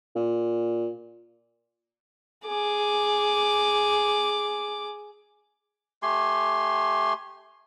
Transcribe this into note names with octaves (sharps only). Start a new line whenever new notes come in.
A#2
G#4 D6
A3 G4 G#5 C6